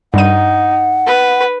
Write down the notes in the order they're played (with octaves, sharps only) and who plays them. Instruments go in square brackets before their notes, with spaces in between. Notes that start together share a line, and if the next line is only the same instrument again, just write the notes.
[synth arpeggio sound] G2 G3 D#7 [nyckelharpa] D#4 [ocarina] F#5
[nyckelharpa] B4